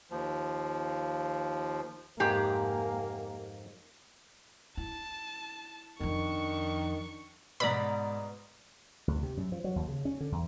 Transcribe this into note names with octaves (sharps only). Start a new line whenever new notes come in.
D#2 F3
F2 G#2 A#3 G4 G#4
E4 A5
F2 D#3 F3 D4 C#6
G#2 B2 B4 D5 A#5 B5
D2
C3
F#2
F3
F#3
D#2
C#3
C#4
D3
E2